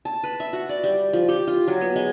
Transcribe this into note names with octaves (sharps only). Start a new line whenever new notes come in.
A5
B4
E5
F#4
D5
G3
F3
G4
F4
F#3
B3
G#3